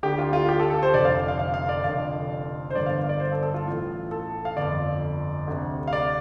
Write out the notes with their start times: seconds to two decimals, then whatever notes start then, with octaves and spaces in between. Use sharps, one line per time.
0.03 D2 D3 G4
0.18 F4
0.33 F4
0.49 G4
0.60 A4
0.70 A4
0.83 C5
0.94 F1 F2 D3 D5
1.05 F5
1.28 F5
1.39 F5
1.54 F5
1.69 D5
1.84 F1 F2 D3 F5
2.70 C5
2.75 G1 G2 D3 D5
2.86 F5
3.04 F5
3.09 D5
3.20 C5
3.32 A4
3.43 A4
3.54 F4
3.66 A1 A2
4.11 A4
4.45 F5
4.56 G1 F2 D3 D5
5.47 D2 C3
5.88 F5
5.93 D5